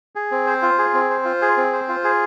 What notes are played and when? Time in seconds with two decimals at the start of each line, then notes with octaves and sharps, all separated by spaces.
0.15 G#4
0.31 C4
0.47 C5
0.62 F4
0.78 G#4
0.94 C4
1.10 C5
1.25 F4
1.42 G#4
1.57 C4
1.73 C5
1.89 F4
2.04 G#4